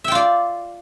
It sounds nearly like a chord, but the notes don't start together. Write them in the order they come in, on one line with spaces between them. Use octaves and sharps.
E5 G5 F4 D5